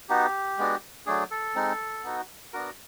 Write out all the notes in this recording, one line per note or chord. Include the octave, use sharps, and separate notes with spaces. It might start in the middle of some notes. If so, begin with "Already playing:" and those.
B3 D#4 F#4 G4
G#3 B3 D4 F#4
F#3 A3 D4 G#4
A4
G#3 C4 D#4
B3 D#4 F#4
B3 D4 F#4 A#4